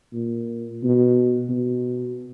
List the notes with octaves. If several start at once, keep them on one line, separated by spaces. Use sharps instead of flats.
A#2
B2
B2